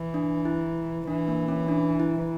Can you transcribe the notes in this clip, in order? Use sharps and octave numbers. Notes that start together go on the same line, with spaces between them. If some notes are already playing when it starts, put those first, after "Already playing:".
Already playing: E3
D4
E4
E3 D4
A#3
C#4
D4
E4